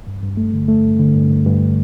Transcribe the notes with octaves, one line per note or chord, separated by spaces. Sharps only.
G2
G2
A3
D3
A3
G2
D3
G2
G2
G2